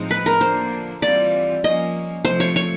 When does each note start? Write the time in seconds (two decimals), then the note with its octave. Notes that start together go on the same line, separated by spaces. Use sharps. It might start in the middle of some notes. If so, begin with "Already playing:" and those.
Already playing: A2 F3 G#3 C4 D#4
0.11 B4
0.26 A#4
0.41 D3 F3 A#3 D4 C5
1.02 E3 G3 C4 F4 D5
1.64 F3 A#3 C#4 D#5
2.25 C3 F3 A3 C5
2.40 C#5
2.56 C#5